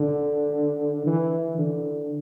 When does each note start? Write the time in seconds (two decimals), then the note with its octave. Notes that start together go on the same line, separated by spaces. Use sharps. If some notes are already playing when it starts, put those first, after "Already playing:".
Already playing: D3
1.06 E3
1.58 D3